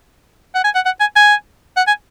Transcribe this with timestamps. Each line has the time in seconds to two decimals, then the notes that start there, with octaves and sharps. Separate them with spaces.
0.55 F#5
0.64 G#5
0.75 F#5
0.85 F#5
1.00 G#5
1.16 G#5
1.77 F#5
1.87 G#5